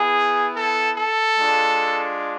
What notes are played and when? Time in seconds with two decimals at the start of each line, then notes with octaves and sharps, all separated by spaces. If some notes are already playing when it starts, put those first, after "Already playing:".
Already playing: B3 E4 G#4
0.55 A4
0.97 A4
1.38 G#3 D4 F4